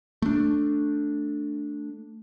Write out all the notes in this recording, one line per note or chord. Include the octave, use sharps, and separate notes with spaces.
A3 D4